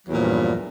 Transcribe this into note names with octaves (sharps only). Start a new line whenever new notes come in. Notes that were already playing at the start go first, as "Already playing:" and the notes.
E2 G2 A#2 F3 F#3